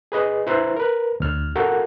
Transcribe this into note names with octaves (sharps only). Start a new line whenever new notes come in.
G#4 B4 D#5
E4 B4 C5 A#5
A#4 B4
D2 F6
F#4 A4 A#4 F5 F#5